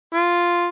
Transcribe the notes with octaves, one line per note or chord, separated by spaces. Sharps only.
F4